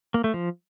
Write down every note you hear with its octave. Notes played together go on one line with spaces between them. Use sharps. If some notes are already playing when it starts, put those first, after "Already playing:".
A#3
A3
F3